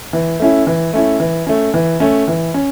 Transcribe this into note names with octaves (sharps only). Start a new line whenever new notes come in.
E3
A3 C#4 E4
E3
A3 C#4 E4
E3
A3 C#4
E3
A3 C#4
E3
C#4